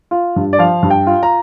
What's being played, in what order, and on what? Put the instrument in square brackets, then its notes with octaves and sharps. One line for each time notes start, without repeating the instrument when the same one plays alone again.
[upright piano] F4
G2
D5
F3 F5
G2
G5
F4
A#5